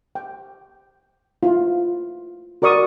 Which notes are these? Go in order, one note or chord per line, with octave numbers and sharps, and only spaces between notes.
G5
E4 F4
F#4 A#4 D5 C#6 D#6